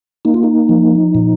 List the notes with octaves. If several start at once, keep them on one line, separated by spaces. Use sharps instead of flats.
A#3 D#4
F4
D#4
F3
A#2